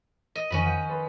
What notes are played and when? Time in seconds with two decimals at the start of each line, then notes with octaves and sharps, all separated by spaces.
0.35 D#5
0.50 F2 D#3 C#4 D#5 B5
0.63 D#3 F#5 G6
0.89 A4 B4 C6